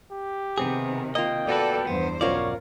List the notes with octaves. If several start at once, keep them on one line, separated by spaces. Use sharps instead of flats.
G4
C3 D#3 B3 C4 G#4
A#3 F4 D#5 G5
B3 F#4 A4 B4 D5
E2 G2 B3 C5
B1 C#4 F4 F#4 A#4 C#5 D5